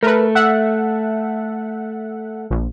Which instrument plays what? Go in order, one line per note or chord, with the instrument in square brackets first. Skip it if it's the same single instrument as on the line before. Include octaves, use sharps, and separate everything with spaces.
[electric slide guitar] A3 [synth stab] A#4 B4
[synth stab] E5 F#5
A#1